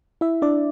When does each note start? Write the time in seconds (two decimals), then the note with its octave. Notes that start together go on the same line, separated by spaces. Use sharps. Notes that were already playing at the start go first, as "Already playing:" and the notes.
0.21 E4 E5
0.42 D4 D5